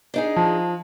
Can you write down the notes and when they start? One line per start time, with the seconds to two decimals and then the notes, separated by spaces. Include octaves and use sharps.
0.14 D4 D#4 G#4
0.36 F3 A5